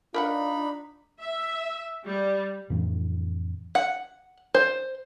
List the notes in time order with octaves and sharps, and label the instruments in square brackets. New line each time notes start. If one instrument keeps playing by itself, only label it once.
[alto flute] D4 [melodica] D#4 B5 [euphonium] F4 [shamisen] A#4 B4 F#5
[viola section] E5
G3
[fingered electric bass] F2 A2 E3 D4
[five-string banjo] F#5
C5